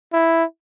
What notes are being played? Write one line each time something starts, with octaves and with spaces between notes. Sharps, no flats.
E4